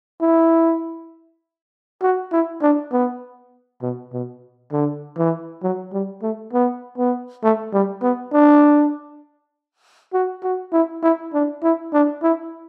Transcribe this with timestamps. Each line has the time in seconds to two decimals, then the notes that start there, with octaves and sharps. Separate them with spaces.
0.21 E4
2.02 F#4
2.32 E4
2.62 D4
2.92 B3
3.82 B2
4.13 B2
4.72 D3
5.17 E3
5.63 F#3
5.93 G3
6.22 A3
6.53 B3
6.98 B3
7.43 A3
7.73 G3
8.02 B3
8.33 D4
10.13 F#4
10.43 F#4
10.73 E4
11.03 E4
11.33 D4
11.63 E4
11.93 D4
12.23 E4